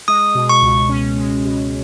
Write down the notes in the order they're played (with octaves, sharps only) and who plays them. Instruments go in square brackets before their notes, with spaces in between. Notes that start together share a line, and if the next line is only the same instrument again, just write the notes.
[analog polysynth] G#3 [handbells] D#6
[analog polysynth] B2
[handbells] C#6
[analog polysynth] C#2
C#4
G#3
B2